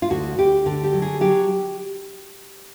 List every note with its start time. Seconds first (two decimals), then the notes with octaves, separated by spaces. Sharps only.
0.02 F4
0.10 D2 F#4
0.38 D2 G4
0.66 D3
0.84 G4
0.93 F#3
1.02 G#4
1.21 F#3 G4